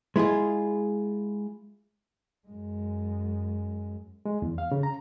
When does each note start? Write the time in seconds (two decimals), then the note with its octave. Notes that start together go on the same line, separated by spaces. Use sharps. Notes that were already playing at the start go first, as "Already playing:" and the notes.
0.16 G#3 E4 F4 G#4
2.48 F#2 G#3
4.25 G#3
4.42 E2
4.58 F5
4.72 C#3
4.83 A#5